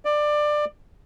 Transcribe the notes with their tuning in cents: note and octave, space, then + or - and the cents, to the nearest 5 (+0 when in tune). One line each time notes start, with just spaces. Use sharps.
D5 +20